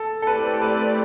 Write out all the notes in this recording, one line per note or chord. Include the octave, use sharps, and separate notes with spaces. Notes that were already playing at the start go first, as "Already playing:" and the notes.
Already playing: A4
A4
A3 C4 E4 G4 B4 D5
A4
B4